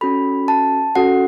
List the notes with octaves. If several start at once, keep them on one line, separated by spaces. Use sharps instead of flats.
C#4 F#4 A4 B5
A5
C#4 F#4 A4 F#5